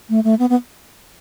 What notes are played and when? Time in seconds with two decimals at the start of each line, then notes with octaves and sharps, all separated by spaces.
0.10 A3
0.24 A3
0.39 B3
0.50 B3